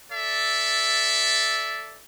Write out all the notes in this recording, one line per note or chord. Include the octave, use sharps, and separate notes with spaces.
A4 D5 E5